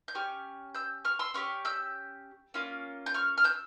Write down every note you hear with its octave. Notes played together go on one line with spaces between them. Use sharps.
G6
C#4 G4 C#6 F6
E6 G6
C#6 F6
C6 E6
C#4 G4 C#6 F6
E6 G6
A#3 C#4 F4
G6
C#6 F6
F6
E6 G6